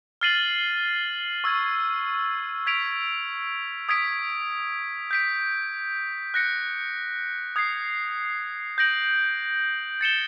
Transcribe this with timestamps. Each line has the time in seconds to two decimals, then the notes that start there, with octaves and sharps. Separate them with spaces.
0.21 F6 A6 C7 D#7 F#7
1.44 C#6 E6 G#6
2.67 G#6 B6 D7 F7
3.89 D#6 G#6 B6 D7
5.11 G6 B6 D7
6.34 F#6 A#6 C#7
7.56 D#6 G#6 C7
8.78 G6 A#6 D7 F#7
10.01 A6 C#7 E7 G7